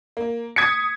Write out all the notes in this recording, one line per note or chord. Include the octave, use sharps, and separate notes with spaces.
A#3
D#6 G#6 B6 C#7